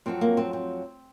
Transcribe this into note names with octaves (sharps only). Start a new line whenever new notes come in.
F2 D#3 F#3 C4
A#3
C4
C4